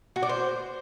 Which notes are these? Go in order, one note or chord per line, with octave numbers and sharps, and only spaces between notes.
F#4
D5
C5